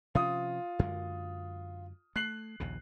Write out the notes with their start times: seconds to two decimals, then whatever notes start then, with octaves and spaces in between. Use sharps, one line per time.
0.15 C3 F3 C#4 F4 D#6
0.79 F#2 D3 G#3
2.16 A3 F#6 C7 F#7
2.60 A#1 D#2 C#3